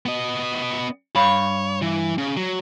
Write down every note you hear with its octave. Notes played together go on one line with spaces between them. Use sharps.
B3 D#5
G2 C#5 F5 B5
E3
C#3
F#3